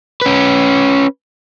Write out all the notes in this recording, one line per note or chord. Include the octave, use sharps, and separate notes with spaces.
C#4 B4